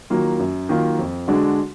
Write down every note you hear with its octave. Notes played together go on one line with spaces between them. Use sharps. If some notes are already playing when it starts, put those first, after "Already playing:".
D#3 F#3 A#3 F4
F#2
D#3 F#3 A#3 F4
F2
D3 G#3 D4 F#4